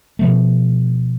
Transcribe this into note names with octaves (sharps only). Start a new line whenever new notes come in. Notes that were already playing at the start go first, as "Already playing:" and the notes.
B2 F3 A3